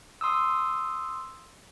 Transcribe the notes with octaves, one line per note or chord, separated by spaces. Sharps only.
C6 D#6 E6